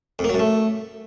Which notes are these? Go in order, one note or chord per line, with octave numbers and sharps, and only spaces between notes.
F2
A#3
F#3
F#2
A3